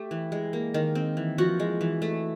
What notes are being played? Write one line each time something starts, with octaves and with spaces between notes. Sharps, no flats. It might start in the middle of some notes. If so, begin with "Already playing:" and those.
Already playing: A3 G4
E3
G#3
A#3
D#3
C4
E3
F3 F#4
G#3
E3
A3